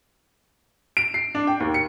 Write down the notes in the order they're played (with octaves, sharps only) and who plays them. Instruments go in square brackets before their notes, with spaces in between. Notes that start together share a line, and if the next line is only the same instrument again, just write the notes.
[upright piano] D7
C7
D4
G5
D#2
C#7